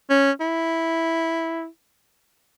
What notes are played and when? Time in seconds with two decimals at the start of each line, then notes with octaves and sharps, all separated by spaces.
0.10 C#4
0.40 E4